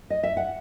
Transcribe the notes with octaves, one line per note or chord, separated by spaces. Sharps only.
D#5
E5
F#5